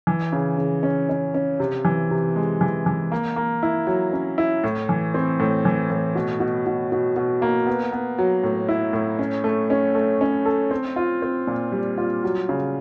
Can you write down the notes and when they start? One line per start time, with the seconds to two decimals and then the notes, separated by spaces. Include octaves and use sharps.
0.07 E3
0.33 C#3
0.58 C#3
0.83 C#4
1.09 C#4
1.34 C#4
1.60 C3
1.85 E3
2.11 C3
2.36 G#3
2.61 E3
2.86 E3
3.12 A#3
3.36 A#3
3.63 E4
3.87 F#3
4.13 C#4
4.38 E4
4.64 A2
4.89 E3
5.14 C4
5.40 A2
5.65 E3
5.90 A2
6.15 B2
6.40 B2
6.66 B2
6.92 B2
7.16 B2
7.42 A#3
7.67 B3
7.92 B3
8.18 F#3
8.43 A2
8.69 E4
8.93 A2
9.19 C#4
9.44 A3
9.70 C#4
9.95 A3
10.21 C#4
10.46 A4
10.71 C4
10.96 F4
11.22 C4
11.47 A#2
11.72 G3
11.98 F4
12.24 F#3
12.49 C#3